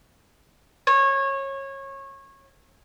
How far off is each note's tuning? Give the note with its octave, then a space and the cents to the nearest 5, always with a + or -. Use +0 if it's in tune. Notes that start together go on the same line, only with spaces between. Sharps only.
C#5 -25